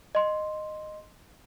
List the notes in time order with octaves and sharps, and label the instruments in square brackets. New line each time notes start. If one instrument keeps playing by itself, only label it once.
[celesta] D#5 C6